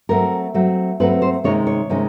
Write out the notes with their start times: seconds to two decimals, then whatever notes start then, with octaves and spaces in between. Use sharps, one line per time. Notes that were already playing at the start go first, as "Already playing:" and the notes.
0.09 F#3 A3 C4 A#4
0.54 F#3 A3 C4
1.00 F#3 A3 C4 B4
1.22 C5
1.44 C3 D#3 G#3 C#4 C#5
1.67 C#5
1.90 C3 D#3 G#3 C#4